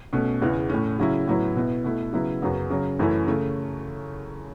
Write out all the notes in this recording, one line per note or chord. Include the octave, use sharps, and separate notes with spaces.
B2 A3 C#4
E2 C#3 E3
A2 A3 C#4
C#3 F#3 C#4 E4
A2 F#3 B3 E4
B2 B3 E4
B2 A3 E4
C#3 F#3 B3 E4
F#2 C#3 F#3 B3
C#3 F#3 C#4
F#2 E3 A3 C#4 E4
C#3 A3